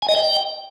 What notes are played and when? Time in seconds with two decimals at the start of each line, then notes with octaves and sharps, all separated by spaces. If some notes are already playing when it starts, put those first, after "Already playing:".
0.02 G#5
0.09 D#5
0.15 G5